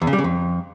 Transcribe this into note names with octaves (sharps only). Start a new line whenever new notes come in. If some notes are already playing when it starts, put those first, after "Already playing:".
E2
C#3
G3
C#3
F2